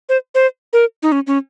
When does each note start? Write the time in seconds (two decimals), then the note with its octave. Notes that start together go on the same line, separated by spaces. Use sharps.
0.09 C5
0.35 C5
0.73 A#4
1.03 D#4
1.12 C#4
1.27 C#4